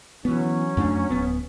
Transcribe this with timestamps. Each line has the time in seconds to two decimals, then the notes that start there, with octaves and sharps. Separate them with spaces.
0.25 E3 F#3 B3 C#4
0.77 F2 A3 D4
1.10 D1 B3